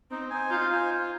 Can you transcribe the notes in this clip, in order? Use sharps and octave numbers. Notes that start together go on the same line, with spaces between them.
C4 D#4
C5 G#5
D#4 F4
C5 G#5
F4